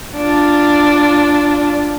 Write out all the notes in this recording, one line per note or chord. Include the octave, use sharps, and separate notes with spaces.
D4 F4